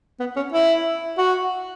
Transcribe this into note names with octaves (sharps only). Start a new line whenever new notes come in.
B3
C#4
E4
F#4